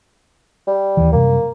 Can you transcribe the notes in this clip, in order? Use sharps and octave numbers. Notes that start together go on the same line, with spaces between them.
G3
D#2 E3
F#2 C3 G3 A#3